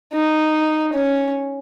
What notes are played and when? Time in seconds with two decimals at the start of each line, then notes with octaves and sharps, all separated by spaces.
0.13 D#4
0.93 C#4